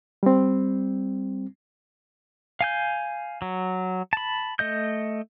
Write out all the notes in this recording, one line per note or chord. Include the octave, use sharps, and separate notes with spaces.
G3 C4
F5 G#5 G6
F#3
A5 B5
A3 D#5 G6